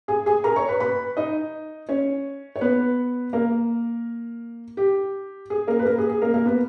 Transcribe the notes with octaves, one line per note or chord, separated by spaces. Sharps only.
G#4 G#5
G#4 G#5
A#4 A#5
C#5 C#6
B4 B5
B4 B5
D#4 D#5
C#4 C#5
C#5
B3 B4
A#3 A#4
G4
G#4
A#3 A#4
B4
A#3 A#4
G#4
G#4
A#3 A#4
A#3 A#4
B3 B4